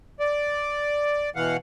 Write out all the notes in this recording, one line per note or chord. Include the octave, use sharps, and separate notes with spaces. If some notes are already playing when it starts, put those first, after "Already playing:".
D5
B2 E3 F5 F#5